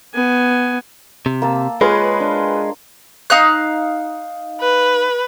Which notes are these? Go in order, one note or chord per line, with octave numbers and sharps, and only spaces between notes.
B3 G#5
C3
A#3 A5 E6
G#3 F4 G#4 B4 C#5 C6
D4
D#4 F5 F#6
B4